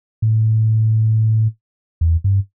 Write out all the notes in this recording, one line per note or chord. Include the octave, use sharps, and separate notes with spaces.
A2
E2
G2